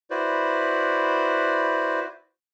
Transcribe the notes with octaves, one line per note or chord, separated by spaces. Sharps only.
E4 F#4 B4 C5 D5